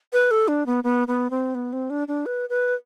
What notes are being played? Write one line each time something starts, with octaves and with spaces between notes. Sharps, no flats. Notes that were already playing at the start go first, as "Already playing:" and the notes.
B4
A4
D4
B3
B3
B3
C4
B3
C4
D4
D4
B4
B4